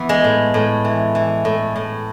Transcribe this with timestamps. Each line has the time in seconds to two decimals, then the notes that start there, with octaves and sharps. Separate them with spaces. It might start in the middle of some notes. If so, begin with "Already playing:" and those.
Already playing: E3 B3
0.09 G#3
0.24 A2
0.54 A2
0.84 E3
1.15 E3
1.45 A2
1.76 A2